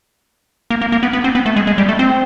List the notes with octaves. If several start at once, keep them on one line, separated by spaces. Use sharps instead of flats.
A#3
A#3
A#3
B3
B3
C4
B3
A3
G#3
G#3
G3
A3
C4